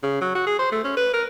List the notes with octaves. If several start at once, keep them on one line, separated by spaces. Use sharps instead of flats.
C#3
F#3
F#4
G#4
C5
A3
C#4
B4
A#4